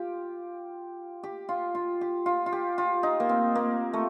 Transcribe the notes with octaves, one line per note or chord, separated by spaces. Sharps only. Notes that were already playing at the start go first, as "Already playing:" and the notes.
Already playing: F4 G4
G4
F4
F4
G4
F4
F4
G4
F4
D#4
A#3
C4
A#3
A3